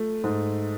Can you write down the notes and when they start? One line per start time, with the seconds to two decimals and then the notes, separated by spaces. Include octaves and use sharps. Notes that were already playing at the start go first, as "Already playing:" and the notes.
Already playing: A3 F4
0.24 G#2